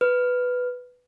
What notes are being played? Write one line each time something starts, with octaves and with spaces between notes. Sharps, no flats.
B4 F6